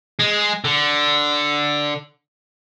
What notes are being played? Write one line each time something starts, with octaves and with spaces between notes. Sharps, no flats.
G#3
D3